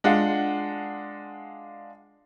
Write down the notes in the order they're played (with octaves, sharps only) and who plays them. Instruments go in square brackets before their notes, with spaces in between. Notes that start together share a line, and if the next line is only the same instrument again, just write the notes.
[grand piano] G#3 D4 F4 F#5